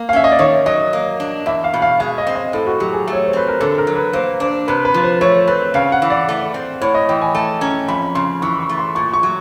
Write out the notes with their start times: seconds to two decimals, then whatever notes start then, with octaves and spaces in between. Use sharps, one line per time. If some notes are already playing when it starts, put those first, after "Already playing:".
Already playing: A#3
0.09 F5
0.13 C#4 E5
0.24 D#5
0.32 D5
0.39 D#3 C#5
0.66 F#3 D#5
0.93 A#3
1.20 D4
1.46 E2 E5
1.64 F5
1.74 B2
1.82 F5
1.99 G#3 F5
2.18 D#5
2.27 C4
2.36 D#5
2.53 A2 A4
2.67 F#4
2.80 F#3 G4
2.93 G#4
3.08 A3
3.13 C#5
3.26 C5
3.33 C4 B4
3.48 A#4
3.60 D3 A4
3.78 A#4
3.87 F#3
3.96 B4
4.13 A#3 C5
4.40 D4 C5
4.68 C3 B4
4.85 B4
4.94 F3
5.03 C5
5.21 A3 C#5
5.48 C4 B4
5.74 C#3 F5
5.92 F#5
6.02 E3
6.10 D5
6.29 A3
6.54 C4
6.81 A2 C#5
6.95 D#5
7.09 E3 G5
7.21 G#5
7.35 A3 A5
7.61 C#4 A#5
7.88 F2 B5
8.15 C#3 C6
8.42 E3 C#6
8.60 C#6
8.69 A3
8.78 C6
8.95 A#2 C#6
9.14 C#6
9.23 F#3